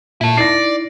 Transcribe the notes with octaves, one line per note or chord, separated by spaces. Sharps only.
A#2 E4 A4
D#4 E4 D5 A#6 C7